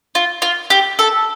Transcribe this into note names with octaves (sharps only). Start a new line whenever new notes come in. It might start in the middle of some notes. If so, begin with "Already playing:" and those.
F4
F4
G4
A4